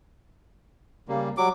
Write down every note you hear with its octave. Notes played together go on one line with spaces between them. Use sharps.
C#3 G3 A#3
F#3 G3 D6